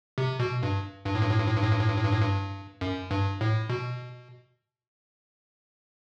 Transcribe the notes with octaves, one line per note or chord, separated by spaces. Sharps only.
C3
B2
G2
G2
A2
G2
A2
G2
A2
G2
A2
G2
A2
G2
A2
G2
A2
G2
F#2
G2
A2
B2